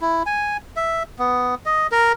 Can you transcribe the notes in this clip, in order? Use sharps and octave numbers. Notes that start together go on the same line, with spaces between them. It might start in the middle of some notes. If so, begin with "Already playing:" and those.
E4
G#5
E5
B3
D#5
A#4